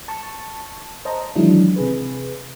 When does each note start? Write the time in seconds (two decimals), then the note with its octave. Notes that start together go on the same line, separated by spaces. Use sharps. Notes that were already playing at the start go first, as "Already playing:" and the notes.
0.08 A5 C#6
1.05 C5 D#5 A5 A#5
1.35 D#3 E3 F#3 G#3 D4 E4
1.76 C3 G#4 B4